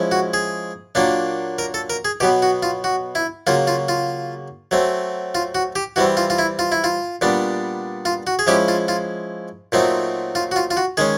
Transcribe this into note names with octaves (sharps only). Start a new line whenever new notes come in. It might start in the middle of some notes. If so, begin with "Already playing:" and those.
Already playing: F3 G#3 C#4 E4
F#4
G#4
A#2 F#3 A#3 D4
A#4
A4
A#4
G#4
B2 F#3 B3 G4
F#4
F4
F#4
E4
C#3 F#3 A#3 F4
F4
F4
F#3 A3 C4
F4
F#4
G4
E3 G3 C4 F#4
F4
F4
E4
F4
E4
F4
A#2 G3 B3 D4
F4
F#4
G#4
F3 G#3 C#4 E4 G4
F4
F4
A#2 F#3 A3 C4 D#4
F4
F#4
F4
F4
F#4
D#3 G#3 C#4 G#4